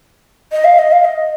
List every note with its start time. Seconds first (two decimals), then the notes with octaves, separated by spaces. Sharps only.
0.52 D#5
0.64 F5
0.79 D#5
0.92 F5
1.05 D#5